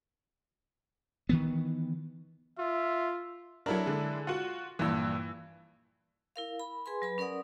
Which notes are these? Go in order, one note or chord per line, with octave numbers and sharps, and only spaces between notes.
D#3 E3 B3
F4 E5
F#3 D4 E4 A4 A#4
D3 G#3
F4 F#4 F#5
A#1 G2 E3 E6
E4 A#4 F5
B5
G#4 B4 G#5 C6
F#3 B4 B5
C#4 A#4 D5 F#5 D#6